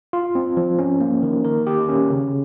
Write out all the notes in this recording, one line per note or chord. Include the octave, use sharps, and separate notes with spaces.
F4
C4
F3
C#4
A#3
D#3
A#4
G4
C#4
C#3